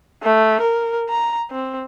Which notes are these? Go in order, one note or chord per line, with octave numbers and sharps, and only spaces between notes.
A3
A#4
A#5
C4